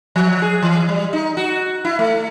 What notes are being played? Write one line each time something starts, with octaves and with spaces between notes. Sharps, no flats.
F3
G#4
E3
G3
D#4
F#4
E4
A3